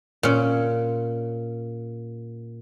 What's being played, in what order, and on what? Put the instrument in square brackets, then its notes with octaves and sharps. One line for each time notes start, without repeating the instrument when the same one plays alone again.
[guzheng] A#2 C#4